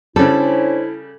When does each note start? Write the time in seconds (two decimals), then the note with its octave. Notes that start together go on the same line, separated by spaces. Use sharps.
0.16 C#3 G3 C#4 D4 E4 A4 C5